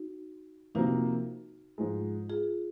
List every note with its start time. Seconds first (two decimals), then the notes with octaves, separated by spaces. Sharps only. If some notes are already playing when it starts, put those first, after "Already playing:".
Already playing: D#4 F#4
0.75 F2 C3 F3 A#3 D#4 F#4
1.78 G#2 F3 G#3
2.30 F4 G#4